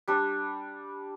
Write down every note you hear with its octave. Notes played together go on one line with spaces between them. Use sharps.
G3 D4